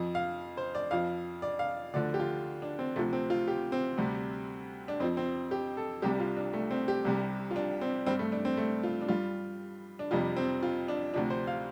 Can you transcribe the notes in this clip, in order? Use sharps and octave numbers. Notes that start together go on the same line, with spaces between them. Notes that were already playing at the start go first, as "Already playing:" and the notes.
Already playing: F2 F3
F5
C5
D5
F2 F3 F5
D5
F5
D2 D3 F3 D5
G4
F4
D4
C4
D2 C3 F3 A3
C4
F4
G4
C4
D2 C3 G3
D4
F2 F3 C4
C4
G4
A4
C2 C3 G3 G4
F4
D4
A3
C4
G4
C2 C3 G3
F4
D4
C4
G2 G3 C4
A3
D4
C4
A3
F4
D4
G2 G3 F4
D4
F2 C3 G3 F4
C4
F4
D4
D2 C3 F3 D4
C5
F5